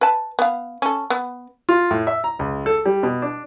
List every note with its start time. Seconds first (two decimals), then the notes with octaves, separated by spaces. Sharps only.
0.01 B4 A5
0.39 B3 F5
0.82 C#4 A4
1.10 B3
1.69 F4
1.91 A2
2.07 E5
2.24 A#5
2.39 C#2
2.66 A4
2.86 G3
3.03 B2
3.22 D4